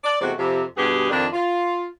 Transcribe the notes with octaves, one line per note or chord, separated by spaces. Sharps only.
D5
E2 C3 G#3 A3 C4 F#4
F2 C3
G2 B2 B3 G4 G#4
F2 D#3 D4
F4